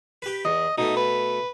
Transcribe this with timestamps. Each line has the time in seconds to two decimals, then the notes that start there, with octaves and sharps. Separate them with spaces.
0.22 G4 B4
0.45 E2 D#5
0.78 B2 A3 D#4
0.97 B4